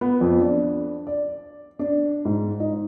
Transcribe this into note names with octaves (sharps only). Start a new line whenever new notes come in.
B3
F2
D4
D5
D4
G#2
D#4